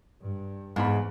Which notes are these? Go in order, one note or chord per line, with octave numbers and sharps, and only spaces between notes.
G2
E2 G#2 B5